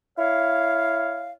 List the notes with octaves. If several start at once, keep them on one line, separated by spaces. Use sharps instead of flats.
E4 C#5 F5